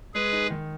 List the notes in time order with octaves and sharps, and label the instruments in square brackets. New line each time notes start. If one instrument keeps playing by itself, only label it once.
[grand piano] G#3 [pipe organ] G#4 B4
[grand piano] D#4
D#3